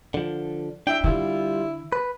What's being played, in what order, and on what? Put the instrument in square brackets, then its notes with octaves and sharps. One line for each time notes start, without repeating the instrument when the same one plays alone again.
[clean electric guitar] D3 F3
[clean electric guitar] D4 E4 E5 [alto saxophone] G5
[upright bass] D3 [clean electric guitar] G3 F4 [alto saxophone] E4
[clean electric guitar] B4